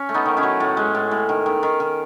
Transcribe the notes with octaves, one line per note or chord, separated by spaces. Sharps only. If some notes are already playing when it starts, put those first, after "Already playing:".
Already playing: C#4
A3
B3 D#4
D#3
C#4 E4
F#3
A2
G#3
A2
A2
D#3
D#3
D#3
D#3